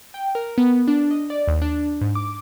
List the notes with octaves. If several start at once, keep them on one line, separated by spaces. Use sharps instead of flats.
G5
A#4
B3
D4
D#5
D5
D#2
D4
G#2
D6